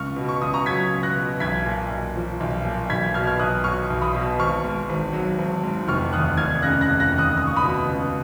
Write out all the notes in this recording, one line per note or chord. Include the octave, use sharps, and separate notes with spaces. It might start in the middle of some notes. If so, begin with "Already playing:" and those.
Already playing: C#2 C#6 F6
B2
C#6
C#2 D#6
A#5 C#6
F#3 G#6 B6
C#2
F#6 A#6
B2
B1 G#6 B6
A#2
B1
F3
B1
A#2
B1 G#6 B6
B2 F6 G#6
F6
B1 D#6 F#6
F#3 C#6 F6
B1
B5 D#6
B2
G#1 C#6 F6
G#2
G#1
F#3
G#1
G#2
F1 C#6 F6
D#2 D#6 F#6
F1 F6 G#6
C#3 F#6 A#6
F#6 A#6
F1
F#6 A#6
D#2
D#6 F#6
C#2 D#6
C#6
B5 D#6
B2
C#2